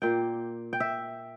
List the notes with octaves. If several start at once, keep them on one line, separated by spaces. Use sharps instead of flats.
A#2 A#3 G5
G5
E5